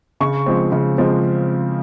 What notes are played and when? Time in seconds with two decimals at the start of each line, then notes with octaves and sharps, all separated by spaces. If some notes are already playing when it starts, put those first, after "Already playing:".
0.20 C#3 C#6
0.46 F3 G#3 C4
0.72 C#3
0.98 F3 G#3 C4